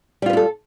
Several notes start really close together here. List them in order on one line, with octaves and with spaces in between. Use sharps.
G3 F4 B4 E4 A4